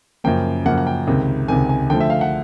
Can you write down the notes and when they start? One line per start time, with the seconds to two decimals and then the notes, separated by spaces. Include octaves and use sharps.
0.24 F#2 C#3 F3 A#3 G5
0.65 F#2 C#3 F3 A#3 F#5
0.78 F#5
0.87 G5
1.07 C#2 C3 D#3
1.48 C#2 C3 D#3 G#5
1.69 G#5
1.90 D3 F3 A3 G5
2.01 E5
2.10 F5
2.21 F#5